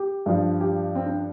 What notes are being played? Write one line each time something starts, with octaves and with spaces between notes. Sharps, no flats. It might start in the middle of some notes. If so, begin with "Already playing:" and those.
Already playing: G4
G2 F3
G4
C4
D4